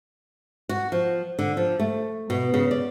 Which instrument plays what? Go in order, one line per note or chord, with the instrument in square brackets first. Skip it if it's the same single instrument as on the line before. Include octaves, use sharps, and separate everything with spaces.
[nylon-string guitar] F#4
F3
D3
F3
A3
B2
C#3
D5